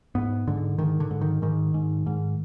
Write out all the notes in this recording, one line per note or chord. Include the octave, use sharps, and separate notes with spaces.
G#2 B3
G#2 D3
G#2 D#3
D3
G#2
D#3
G#2 D#3
G#2
G#2